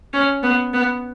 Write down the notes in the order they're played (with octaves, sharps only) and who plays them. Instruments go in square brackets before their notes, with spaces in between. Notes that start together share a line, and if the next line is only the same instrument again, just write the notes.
[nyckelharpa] C#4
B3
B3